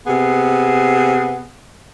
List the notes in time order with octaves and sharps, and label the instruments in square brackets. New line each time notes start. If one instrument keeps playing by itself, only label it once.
[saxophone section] C3 B3 G#4